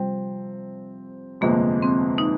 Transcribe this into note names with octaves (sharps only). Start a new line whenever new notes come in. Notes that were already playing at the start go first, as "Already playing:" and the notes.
Already playing: C3 F3 G3 C4
G1 F2 C3 F3 G#3 A#3
C4
D#4